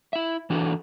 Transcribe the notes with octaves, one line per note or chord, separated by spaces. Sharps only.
E4 E5
E3 D4 F#4 A4